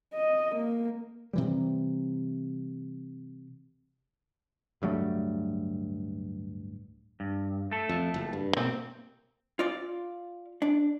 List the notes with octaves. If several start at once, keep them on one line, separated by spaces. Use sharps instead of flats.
D#5
A#3
C3 E3 G3
D1 G2 F#3 A3
G2
A3 A4
F2
F#1
G2
B2 A#3 C4
F4 D5
D4